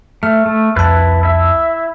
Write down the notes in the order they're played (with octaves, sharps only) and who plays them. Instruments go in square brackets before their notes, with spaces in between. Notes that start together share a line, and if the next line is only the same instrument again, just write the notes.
[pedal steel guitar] A3 [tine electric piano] F6
[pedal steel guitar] A3
[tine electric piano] C2 F2 A5 [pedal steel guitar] E4 B4 F#6
[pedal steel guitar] E4 E5